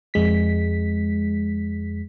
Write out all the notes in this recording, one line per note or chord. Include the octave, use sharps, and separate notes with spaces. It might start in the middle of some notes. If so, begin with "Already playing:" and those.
F2 G#3 B6